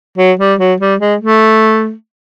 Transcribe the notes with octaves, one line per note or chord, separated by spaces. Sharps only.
F#3
G3
F#3
G3
G#3
A3